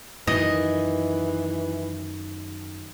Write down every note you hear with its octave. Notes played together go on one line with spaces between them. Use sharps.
F#2 D#3 E3 D#5